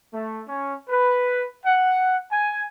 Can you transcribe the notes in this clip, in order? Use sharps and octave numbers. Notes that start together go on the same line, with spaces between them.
A3
C#4
B4
F#5
G#5